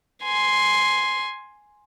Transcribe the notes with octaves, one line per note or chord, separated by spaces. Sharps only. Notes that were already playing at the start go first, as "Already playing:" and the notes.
G#5 C6